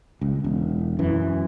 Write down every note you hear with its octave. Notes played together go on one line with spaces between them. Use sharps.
C#2
E1
F#2 E3